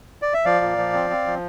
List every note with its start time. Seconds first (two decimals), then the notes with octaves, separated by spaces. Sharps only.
0.22 D5
0.34 E5
0.45 F3 D5 F5
0.61 A#2
0.78 F3
0.93 C4
1.10 C4
1.26 F3